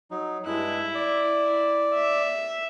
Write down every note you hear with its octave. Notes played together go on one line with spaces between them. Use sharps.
F#3 D#4
G2 G#3 E4 F#6
D5
E5